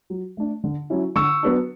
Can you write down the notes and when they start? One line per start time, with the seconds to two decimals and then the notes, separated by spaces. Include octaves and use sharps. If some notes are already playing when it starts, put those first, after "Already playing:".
0.10 F#3
0.37 A3 D4
0.64 D3
0.90 F#3 C#4 E4
1.16 D3 C#6 E6
1.43 F#3 B3 D4